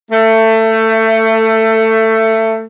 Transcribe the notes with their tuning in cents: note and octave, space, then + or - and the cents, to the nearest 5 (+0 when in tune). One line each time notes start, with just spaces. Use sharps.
A3 +20